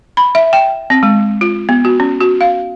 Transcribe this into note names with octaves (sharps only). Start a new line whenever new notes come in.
B5
E5
G5
C4
G#3
F4
B3
F#4
C#4
F#4
F5